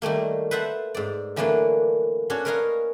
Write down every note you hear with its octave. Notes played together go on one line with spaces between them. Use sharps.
D#3 G3 A3 A#3
B4 C5 E5 F#5 A5
G#2 D5
D3 E3 F#3 A3 A#3 D4
C#4 D4 F#4 C#5
A#4 B4 C#5 D#5 F5 A#5